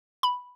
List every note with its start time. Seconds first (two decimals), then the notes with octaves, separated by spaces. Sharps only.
0.23 B5